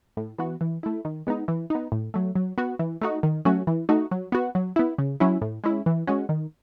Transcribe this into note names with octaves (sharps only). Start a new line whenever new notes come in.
A2
E3 B3 F#4
E3
A3 E4
D#3
G#3 B3 D#4
E3
B3 D#4
A2
F#3 A3
F#3
B3 F#4
E3
A3 D#4 F#4
D#3
F#3 A3 C#4 F#4
E3
A3 D#4 F#4
F#3
B3 F#4
F#3
B3 E4
C#3
F#3 C#4 E4
A2
G#3 C#4 E4
E3
G#3 C#4 F#4
D#3